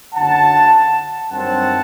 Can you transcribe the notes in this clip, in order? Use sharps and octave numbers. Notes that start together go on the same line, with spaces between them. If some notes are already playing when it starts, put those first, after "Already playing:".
F#1 F#2 D3 F#5 A5
G2 D#3 F#3 A3 C4 F#5 A5